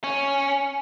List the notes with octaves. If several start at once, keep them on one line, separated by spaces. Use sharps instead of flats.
C#4